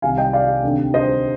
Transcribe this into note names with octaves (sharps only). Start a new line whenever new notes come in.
C2 C3 D#3 F5 G#5
D#5 G5
D5 F5
D2 C3 D#3
C5 D#5